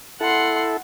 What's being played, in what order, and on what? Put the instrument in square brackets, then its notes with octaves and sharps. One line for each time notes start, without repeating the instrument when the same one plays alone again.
[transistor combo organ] E4 A4 [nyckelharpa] F#5 C6